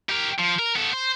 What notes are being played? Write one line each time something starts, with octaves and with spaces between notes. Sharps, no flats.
G4 A#4
F3
A#4
B3 A4
C5